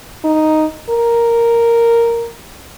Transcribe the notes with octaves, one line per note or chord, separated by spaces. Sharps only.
D#4
A#4